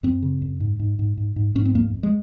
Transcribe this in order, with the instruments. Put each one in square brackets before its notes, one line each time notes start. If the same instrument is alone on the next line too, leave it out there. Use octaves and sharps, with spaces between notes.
[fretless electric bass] F#2 C4
C#3
F#2
G#2
G#2
G#2
G#2
G#2
G#2 C#4
C4
F2 A#3
F2
G#3